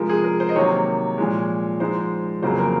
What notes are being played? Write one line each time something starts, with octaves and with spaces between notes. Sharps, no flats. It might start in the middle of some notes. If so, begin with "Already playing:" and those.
Already playing: C3 F3 G#3 A#4
G#4
A#4
C5
D#5
C3 D#3 F#3 A#3 C#5
A#2 F3 G#3
G#2 F3 G#3 C5
F2 C#3 F#3 A#3 C5
A#4